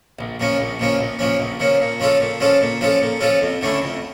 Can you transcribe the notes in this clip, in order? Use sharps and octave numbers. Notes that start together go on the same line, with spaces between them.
A#1
A#2 F3 C#4
A#1
A#2 F3 C#4
A#1
A#2 F3 C#4
A#1
A#2 F3 C#4
A#2
F3 C#4 F4 A4
A#2
F3 C#4 F4 A4
A#2
F3 C#4 F4 A4
A#2
F3 C#4 F4 A4
F2
D3 A3 C#4 E4
F2